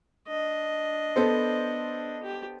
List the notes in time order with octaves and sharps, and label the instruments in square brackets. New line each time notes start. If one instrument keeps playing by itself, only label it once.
[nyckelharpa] D4 D#5
[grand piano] B3 A4 C5
[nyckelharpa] G4